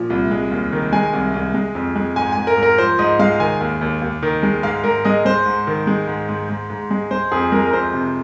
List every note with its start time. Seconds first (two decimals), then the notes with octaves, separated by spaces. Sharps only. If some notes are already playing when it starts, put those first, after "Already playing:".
Already playing: A#2 F3
0.10 C2
0.31 G#3
0.51 D#2
0.72 D#3
0.92 G#3 G#5
1.13 C2
1.34 C2
1.54 G#3
1.75 F2
1.95 G#3
2.16 G#2 G#5
2.32 G#2 G#5
2.47 A#4
2.57 G#2
2.63 A#4
2.78 F3 C5
2.99 G#2 D#5
3.19 G#3 F5
3.40 D#3 G#5
3.60 D#2
3.81 D#2
4.01 D#2
4.22 D#3
4.43 G#3
4.63 G#2 F5
4.84 G#2 A#4
5.05 G#3 D#5
5.25 G#3 C5
5.46 G#2
5.67 D#3
5.87 G#3
6.07 G#2
6.29 G#2
6.49 G#2
6.70 G#2
6.91 G#3
7.11 G#3 C5
7.32 F2 G#4
7.52 G#3 A#4
7.67 A#4
7.72 F2 C5
7.93 C3